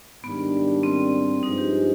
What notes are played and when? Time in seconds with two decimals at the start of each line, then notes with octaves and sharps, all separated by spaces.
0.24 G#2 D#3 G3 B3 D4 G4
0.83 C4
1.43 G2 F3 G#3 D#4
1.58 G4